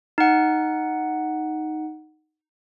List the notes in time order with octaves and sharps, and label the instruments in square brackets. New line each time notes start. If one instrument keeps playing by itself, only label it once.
[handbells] D#4 F#5